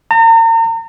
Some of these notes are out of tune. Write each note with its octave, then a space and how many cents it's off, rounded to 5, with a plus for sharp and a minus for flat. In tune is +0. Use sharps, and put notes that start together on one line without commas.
A#5 -40